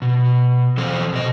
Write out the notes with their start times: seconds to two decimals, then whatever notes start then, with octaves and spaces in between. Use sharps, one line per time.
0.02 B2
0.77 E3 C4 A4 C5
1.13 B2 D#5